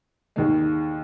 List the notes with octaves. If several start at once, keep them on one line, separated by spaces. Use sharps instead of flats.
D#2 D#3 G#3